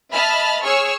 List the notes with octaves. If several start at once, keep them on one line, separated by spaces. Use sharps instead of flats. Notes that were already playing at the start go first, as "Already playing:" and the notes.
D#5 E5 A5 B5 F6
G#4 C#5 C#6 E6 F6